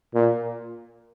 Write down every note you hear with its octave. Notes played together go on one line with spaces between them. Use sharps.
A#2